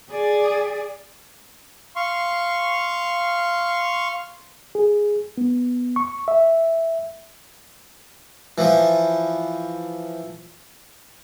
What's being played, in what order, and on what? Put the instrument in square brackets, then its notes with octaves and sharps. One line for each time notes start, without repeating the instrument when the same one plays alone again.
[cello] G#4 D5
[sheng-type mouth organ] F5 C6 C#6
[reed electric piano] G#4
B3
C#6
E5
[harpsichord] E3 F3